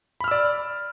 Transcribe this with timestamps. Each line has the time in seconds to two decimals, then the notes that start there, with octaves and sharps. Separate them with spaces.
0.20 B5
0.24 F6
0.28 E6
0.31 D5